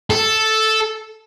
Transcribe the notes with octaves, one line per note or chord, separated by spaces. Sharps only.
A4